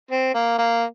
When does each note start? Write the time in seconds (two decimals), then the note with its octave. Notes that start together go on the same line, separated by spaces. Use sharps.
0.11 C4
0.35 A#3
0.58 A#3